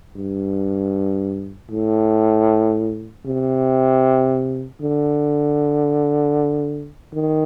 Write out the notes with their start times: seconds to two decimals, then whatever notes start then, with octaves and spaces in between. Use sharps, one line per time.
0.16 G2
1.71 A2
3.26 C3
4.81 D3
7.14 D#3